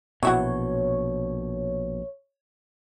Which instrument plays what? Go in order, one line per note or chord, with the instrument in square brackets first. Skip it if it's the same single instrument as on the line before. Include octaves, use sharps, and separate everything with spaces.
[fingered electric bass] A#1 B2 [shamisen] F#3 E4 F#4 [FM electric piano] C#5